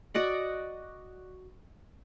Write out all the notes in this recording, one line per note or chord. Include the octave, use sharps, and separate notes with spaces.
F#4 D5 D#5 F#5